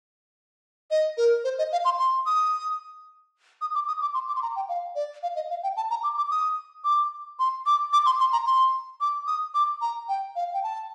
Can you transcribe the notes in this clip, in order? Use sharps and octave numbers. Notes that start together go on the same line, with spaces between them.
D#5
A#4
C5
D#5
F5
C6
C6
D#6
D#6
D6
D#6
D6
C6
D6
C6
A#5
G5
F5
D5
F5
D#5
F5
G5
A5
A#5
D6
D6
D#6
D6
C6
D6
D6
C6
C6
A#5
C6
D6
D#6
D6
A#5
G5
F5
G5
A5